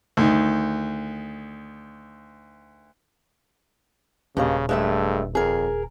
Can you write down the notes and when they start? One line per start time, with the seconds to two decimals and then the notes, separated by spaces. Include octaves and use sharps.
0.17 D2 D#3
4.37 D#1 G2 C#3 A#3 D#5
4.69 G2 G#3 A3 E5
5.35 F2 G#4 A#4